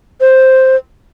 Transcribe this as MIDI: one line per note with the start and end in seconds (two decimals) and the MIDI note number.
0.20 0.76 72